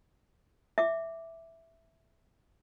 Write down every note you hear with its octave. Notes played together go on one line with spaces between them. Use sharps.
E5 D6